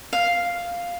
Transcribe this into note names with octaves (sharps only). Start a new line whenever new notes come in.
F5